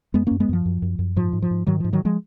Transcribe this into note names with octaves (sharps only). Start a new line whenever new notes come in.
F#2 G#3 B3
F#2 A#3 C#4
G#3 B3
F#2 F3
F#2
F#2
F#2
G#2 F3
G#2
F3
G#2
G#2 D#3 F#3
G#2 F3
D#3 F#3
F3 G#3